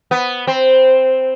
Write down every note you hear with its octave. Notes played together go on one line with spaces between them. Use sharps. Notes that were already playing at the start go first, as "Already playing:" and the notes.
B3
C4